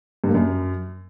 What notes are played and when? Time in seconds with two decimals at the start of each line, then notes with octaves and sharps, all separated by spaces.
0.24 G2
0.29 A#3
0.34 F#2